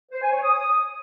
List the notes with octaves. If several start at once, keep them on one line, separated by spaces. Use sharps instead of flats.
C5
G#5
C#5
D#6